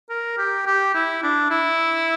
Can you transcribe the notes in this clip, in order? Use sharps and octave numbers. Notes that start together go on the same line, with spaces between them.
A#4
G4
G4
E4
D4
E4